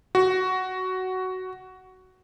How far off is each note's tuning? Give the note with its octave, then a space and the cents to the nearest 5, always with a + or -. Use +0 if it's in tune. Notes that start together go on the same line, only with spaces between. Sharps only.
F#4 +10